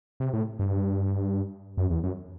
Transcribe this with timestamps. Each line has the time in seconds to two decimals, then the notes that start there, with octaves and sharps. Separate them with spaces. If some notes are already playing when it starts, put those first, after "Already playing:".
0.20 C3
0.33 A2
0.59 G2
1.77 F#2
1.90 E2
2.04 F#2